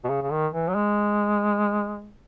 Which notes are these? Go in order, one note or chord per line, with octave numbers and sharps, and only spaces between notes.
B2
C#3
C#3
D#3
E3
F#3
G#3